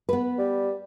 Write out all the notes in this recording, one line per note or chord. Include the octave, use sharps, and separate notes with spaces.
B3 B4
G3